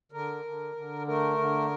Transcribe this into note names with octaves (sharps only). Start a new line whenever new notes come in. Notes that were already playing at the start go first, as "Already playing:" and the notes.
D3 A#4
D3
D3
A3 A#4
D3